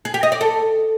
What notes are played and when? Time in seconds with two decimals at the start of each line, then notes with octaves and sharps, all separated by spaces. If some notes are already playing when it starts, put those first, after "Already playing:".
0.05 G#4
0.14 G4
0.23 D#5
0.32 D5
0.41 A4